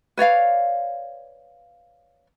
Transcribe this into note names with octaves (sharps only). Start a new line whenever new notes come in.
B4 C#5 D5 F5